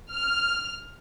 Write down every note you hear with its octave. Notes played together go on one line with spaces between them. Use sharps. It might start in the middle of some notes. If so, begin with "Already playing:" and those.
F6